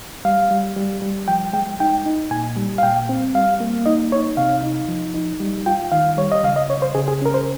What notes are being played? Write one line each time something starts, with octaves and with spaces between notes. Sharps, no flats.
G3 F5
G3
G3
G3
F3 G5
G#3 G5
D#4 G5
D#4
A#2 G#5
G3
F5
A#2 G5
C4
G3 F5
A#3
D#4 D#5
D#4 C#5
C3 F5
D#4
F3
D#4
G3
F4 G5
D#3 F5
G3 C#5
D#5
C#3 F5
D#5
C#3 C#5
C5
C#3 G#4
G#4
C#4 A#4
C5